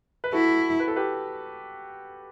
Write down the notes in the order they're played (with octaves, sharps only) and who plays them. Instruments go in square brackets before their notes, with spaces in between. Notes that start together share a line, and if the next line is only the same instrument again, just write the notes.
[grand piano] B4
[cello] E4 [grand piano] F#4 A4
[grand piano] B4
A4
G4 B4